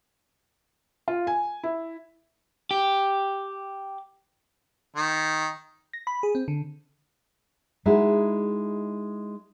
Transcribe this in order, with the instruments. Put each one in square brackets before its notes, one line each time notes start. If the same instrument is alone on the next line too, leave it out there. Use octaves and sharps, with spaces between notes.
[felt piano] F4
G#5
E4
[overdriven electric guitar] G4
[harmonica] D#3
[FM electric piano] A#6
B5
G#4
C4
D3
[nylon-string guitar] G#3 D#4 E4 F#4